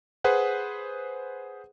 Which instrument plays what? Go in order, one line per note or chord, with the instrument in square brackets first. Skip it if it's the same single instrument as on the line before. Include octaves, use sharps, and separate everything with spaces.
[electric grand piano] G#4 B4 C5 F#5